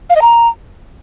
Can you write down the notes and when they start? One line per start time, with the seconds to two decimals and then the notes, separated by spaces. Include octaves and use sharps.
0.10 F5
0.16 D#5
0.22 A#5